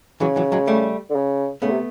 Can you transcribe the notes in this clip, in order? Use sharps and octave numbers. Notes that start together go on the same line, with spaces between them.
C#3 E3 F#3
E3 F#3
F#3 G#3
G3 A3
D3
C#3
C#3 A3 B3
C3